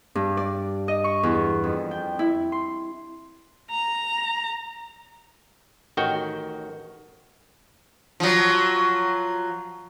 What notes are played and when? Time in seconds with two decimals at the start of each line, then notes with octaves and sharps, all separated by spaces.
0.15 G2
0.37 D5
0.88 D#5
1.04 C#6
1.23 E2
1.64 F2
1.91 G5
2.19 E4
2.52 C6
3.70 A#5
5.97 A1 D#3 F#4 G5
8.20 F3 F#3